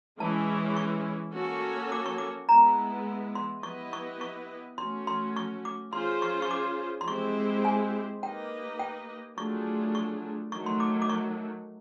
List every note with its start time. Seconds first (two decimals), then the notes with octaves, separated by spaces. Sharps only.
0.19 E3 G#3 C#4 E4 G#4 A5
0.76 C#6
1.34 A#3 C#4 F#4 A4 C#5
1.92 D6
2.06 C#6
2.18 D6
2.49 G#3 B3 E4 A#5
3.35 C6
3.63 B3 E4 G4 B4 D#5 C#6
3.93 C#6
4.21 C#6
4.78 A3 C#4 F#4 C6
5.07 C6
5.36 C#6
5.65 D6
5.93 C#4 F4 G#4 C5 C6
6.22 C#6
6.42 C#6
6.51 D6
7.01 C6
7.08 G#3 C4 E4 G4 C5 C#6
7.65 G#5
8.22 A#3 D#4 G4 B4 D#5 G5
8.79 G5
9.37 F#3 A3 D4 F4 G#4 C#6
9.95 C#6
10.52 D#3 F#3 A3 C#6
10.66 C6
10.80 D6
11.02 D6
11.09 C#6